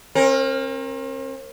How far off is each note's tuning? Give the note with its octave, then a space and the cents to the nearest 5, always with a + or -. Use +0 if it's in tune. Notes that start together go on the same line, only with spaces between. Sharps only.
C4 +45 A#4 +0